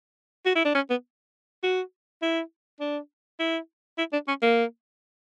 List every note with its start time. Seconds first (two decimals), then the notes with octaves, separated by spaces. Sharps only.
0.46 F#4
0.55 E4
0.65 D4
0.75 C#4
0.90 B3
1.63 F#4
2.22 E4
2.80 D4
3.39 E4
3.98 E4
4.13 D4
4.28 C#4
4.42 A#3